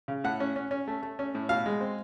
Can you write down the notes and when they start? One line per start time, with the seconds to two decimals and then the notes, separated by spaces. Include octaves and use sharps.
0.08 C#3
0.24 A2 F#5
0.40 C#4
0.56 C#4
0.71 C#4
0.88 A3
1.02 A3
1.19 C#4
1.35 A2
1.49 B2 F5
1.66 G#3
1.81 C4